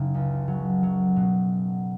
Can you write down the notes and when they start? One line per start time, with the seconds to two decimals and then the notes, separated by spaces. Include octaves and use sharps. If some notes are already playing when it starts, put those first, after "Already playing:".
Already playing: F#1 C#3 D#4
0.14 C#2
0.48 F#3
0.83 F#3
1.16 B2